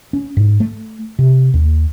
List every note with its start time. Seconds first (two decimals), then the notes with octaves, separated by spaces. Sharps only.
0.13 C#4
0.37 G#2
0.60 A3
1.19 C3
1.54 D#2